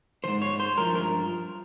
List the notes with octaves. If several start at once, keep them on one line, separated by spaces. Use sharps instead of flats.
G#2 D#3 C5
C#5
C5
G2 F3 A#4
A#4